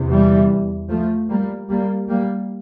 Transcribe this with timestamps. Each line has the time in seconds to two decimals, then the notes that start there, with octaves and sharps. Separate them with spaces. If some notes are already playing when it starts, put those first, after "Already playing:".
Already playing: E2 C3
0.10 E3 G3
0.90 F3 A3
1.30 G3 A#3
1.69 G3 A#3
2.09 G3 A#3